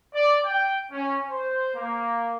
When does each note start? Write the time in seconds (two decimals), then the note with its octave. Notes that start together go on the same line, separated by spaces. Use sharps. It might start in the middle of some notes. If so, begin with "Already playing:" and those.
0.14 D5
0.46 G5
0.91 C#4
1.29 C5
1.75 A#3